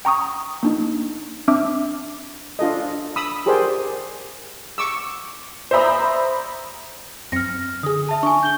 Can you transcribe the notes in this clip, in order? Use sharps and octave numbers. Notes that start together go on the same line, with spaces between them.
G5 A#5 C#6 D#6
A#3 D4 D#4
C4 D4 E5 D6
D4 F4 A4 D#5
B5 D#6 E6
G4 G#4 A#4 C5 D5
C#6 D6 E6
C5 D5 E5 A#5 B5 D#6
F#2 C4 F6 A#6 C#7
D3 G#4 D#6
E5 A5
D4 G#5 C#6
G#5 G6 G7